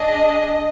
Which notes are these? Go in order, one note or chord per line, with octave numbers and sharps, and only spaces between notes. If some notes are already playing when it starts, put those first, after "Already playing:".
Already playing: D4 G#4 D#5